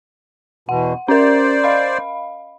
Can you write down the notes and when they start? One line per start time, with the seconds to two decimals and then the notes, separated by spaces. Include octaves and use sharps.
0.69 E2 B2 F#5
1.08 C#4 A#4 C5 D5
1.64 D#5 F5 B5